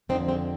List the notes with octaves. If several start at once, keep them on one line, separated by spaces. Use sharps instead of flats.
F2 D3 C4 D#4
G#3 C4